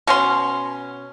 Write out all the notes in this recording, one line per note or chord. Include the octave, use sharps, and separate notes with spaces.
B2 C#4 C6